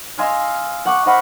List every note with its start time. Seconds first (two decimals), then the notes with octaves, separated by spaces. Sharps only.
0.18 D#5 F5 G#5 C6 E6 F6
0.85 F#5 C#6 D6
1.06 C5 D#5 F#5 B5 C#6 F6